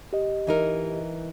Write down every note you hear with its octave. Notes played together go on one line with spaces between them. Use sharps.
G4 D#5
E3 D#4 A#4